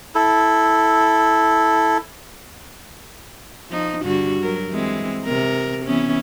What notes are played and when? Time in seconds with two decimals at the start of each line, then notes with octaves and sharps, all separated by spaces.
0.15 E4 A4
3.71 F3 D#4
4.03 G2 D3 F#4
4.42 F#3 A#4
4.70 E3 G#3 C4
5.25 C3 A#4
5.85 E3 B3 C#4